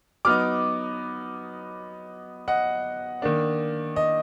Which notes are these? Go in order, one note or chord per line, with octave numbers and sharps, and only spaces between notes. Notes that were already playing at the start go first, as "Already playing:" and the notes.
F#3 B3 D#4 D6 F6
D#5 F#5
D#3 A#3 D4
D#5